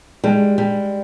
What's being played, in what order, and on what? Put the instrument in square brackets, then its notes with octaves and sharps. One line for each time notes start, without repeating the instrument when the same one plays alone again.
[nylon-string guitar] G3 [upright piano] G#3
[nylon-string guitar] G3